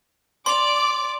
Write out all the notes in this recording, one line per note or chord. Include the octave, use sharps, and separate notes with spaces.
D5 C6 D6 F7